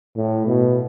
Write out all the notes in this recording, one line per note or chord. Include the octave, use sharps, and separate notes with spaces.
A2
B2